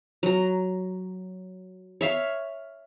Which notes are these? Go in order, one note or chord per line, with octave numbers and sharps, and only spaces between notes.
F#3 A#5
C#5 E5 F5